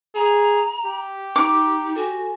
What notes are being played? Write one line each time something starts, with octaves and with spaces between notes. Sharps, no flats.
G#4 A#5
G4
D#4 D6
F#4 A4 G#5